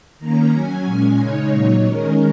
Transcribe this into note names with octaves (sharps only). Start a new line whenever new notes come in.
D#3 A#3 C#4 A#5
F#3 C#4 G#5
A#2 G#3 C#4
C#3 G#3 D#4 C#5
A#2 F#3 D#4
D#3 G#3 C#4 A#4